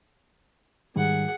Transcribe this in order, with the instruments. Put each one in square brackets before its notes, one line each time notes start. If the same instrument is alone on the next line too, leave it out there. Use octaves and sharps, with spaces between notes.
[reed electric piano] G#2 D#3 G3 [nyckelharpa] G#4 F#5